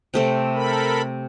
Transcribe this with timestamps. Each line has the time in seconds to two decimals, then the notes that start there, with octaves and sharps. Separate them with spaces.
0.14 C3 A3 C4
0.54 A4 A#4 B5